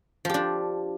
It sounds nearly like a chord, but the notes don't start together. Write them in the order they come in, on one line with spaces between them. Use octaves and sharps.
F3 G4 D4